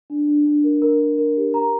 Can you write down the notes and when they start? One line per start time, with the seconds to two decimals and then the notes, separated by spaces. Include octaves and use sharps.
0.10 D4
0.27 D4
0.46 D4
0.64 A#4
0.82 A#4
1.00 A#4
1.18 A#4
1.37 G4
1.54 A#5